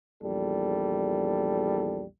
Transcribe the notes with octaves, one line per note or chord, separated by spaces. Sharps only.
A#1 E2 G3 A4